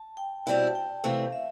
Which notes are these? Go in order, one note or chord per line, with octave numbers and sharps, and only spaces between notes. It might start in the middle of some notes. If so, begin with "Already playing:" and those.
Already playing: A5
G5
B2 G3 C4 E4 G5
A5
G5
E2 C3 E3 A3 C4 F5
E5